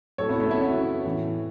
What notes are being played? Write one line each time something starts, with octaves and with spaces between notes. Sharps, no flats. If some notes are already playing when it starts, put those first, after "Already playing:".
A2 F#3 A4 C#5
B3 E4
A3 C#4
B3 E4
C#4 F#4
A2 E3